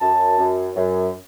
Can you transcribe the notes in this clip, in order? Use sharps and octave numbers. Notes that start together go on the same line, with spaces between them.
F#2 A5
F#2
F#2